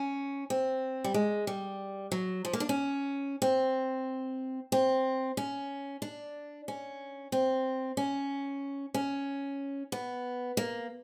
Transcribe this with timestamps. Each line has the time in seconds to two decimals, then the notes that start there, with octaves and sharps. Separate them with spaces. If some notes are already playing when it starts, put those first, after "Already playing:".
Already playing: C#4
0.50 C4
1.04 G3
1.14 G#3
1.47 G3
2.12 F#3
2.45 F3
2.53 A#3
2.60 D4
2.69 C#4
3.42 C4
4.72 C4
5.37 C#4
6.02 D4
6.68 C#4
7.32 C4
7.97 C#4
8.94 C#4
9.92 B3
10.57 A#3